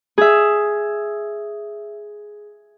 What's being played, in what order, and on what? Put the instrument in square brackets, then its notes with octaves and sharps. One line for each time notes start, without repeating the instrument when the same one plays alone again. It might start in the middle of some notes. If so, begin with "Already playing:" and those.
[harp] G#4 E5